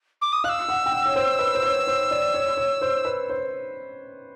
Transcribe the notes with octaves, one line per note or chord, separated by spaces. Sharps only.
D6
D#6
F5 E6 F#6
F#5
G5
F#5
C#5
C5
B4
C5
C#5
C5
D5
C#5
C#5
C5
B4
C5